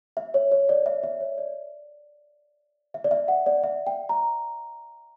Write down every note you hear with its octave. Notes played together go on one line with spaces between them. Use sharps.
E5
C#5
C#5
D5
E5
E5
C#5
D5
E5
D5
E5
F#5
D5
E5
G5
A#5